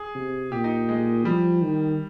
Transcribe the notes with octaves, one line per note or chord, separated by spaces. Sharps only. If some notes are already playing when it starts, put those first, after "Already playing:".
Already playing: G#4
C3
A#2 G4
D#4
G#3
F3 G3
D#3